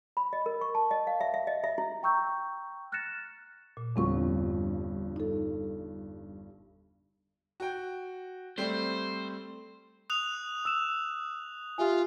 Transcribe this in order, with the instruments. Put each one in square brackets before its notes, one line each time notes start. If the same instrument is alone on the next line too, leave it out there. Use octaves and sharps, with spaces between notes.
[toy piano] B5
D#5
A#4
C#6
A5
D#5
F5
E5
E5
D#5
E5
E4
[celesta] G5 A#5 C#6 E6 G6
F6 F#6 A6 A#6 C#7 E7
[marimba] A#2
[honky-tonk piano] G1 G2 F3 [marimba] E2 C4 C#6
[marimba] D#4 A4
[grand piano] F#4 G5
[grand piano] G3 A3 C4 [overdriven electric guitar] C5
[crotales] D#6 F#6 F7
[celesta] E6 E7
[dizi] F4 [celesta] G4 E5 G#5